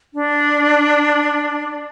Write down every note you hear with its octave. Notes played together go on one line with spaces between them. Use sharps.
D4